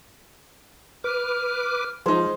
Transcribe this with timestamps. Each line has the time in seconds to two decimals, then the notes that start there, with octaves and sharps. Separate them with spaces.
1.04 B4 D6 F6
2.06 F3 G#3 D#4 C5